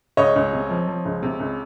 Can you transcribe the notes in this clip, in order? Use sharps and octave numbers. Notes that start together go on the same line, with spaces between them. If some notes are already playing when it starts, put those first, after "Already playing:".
C#2 C#5 D#5
C#2
C3
F3
F3
C#2
C3
C#2